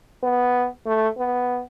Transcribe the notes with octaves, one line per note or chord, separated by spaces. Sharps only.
B3
A3
B3